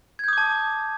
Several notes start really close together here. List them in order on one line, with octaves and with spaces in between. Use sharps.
G#6 G6 D#6 D6 A5